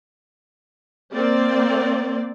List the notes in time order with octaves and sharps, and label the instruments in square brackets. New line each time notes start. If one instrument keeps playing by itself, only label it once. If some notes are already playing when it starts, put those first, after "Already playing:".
[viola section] A#3 C4 D5